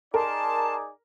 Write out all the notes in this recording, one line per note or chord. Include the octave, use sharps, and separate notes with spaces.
D#4 G#4 A#4 D5 A5 C6